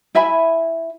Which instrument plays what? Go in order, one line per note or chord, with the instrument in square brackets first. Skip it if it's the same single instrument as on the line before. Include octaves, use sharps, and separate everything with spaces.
[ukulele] E4 E5 G#5 B5